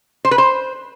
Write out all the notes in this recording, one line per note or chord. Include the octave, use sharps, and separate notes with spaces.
C5
B4
C5